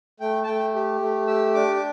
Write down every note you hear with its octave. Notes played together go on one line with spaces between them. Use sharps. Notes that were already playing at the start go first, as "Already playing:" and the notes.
A3 G5
A5
A3 G5
G4
A3
G4 E6
D4 D6
D6